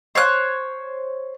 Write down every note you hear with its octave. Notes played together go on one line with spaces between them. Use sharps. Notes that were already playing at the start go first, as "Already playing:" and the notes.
C5 C#5 F#6